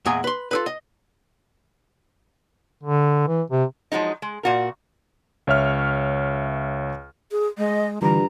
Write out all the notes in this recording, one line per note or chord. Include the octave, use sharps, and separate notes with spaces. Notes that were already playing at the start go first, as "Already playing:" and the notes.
E2 A#2 G#3 G#4 G#5 A#5
B4 C6
F4 A4 B4
D#5
D3
E3
C3
F3 F#3 G#3 D#4
G#3
A#2 F#4 A#4
C#2 C#5 E5 F6
G#4
G#3 D#5
G2 D3 E3 G3 F4 A#5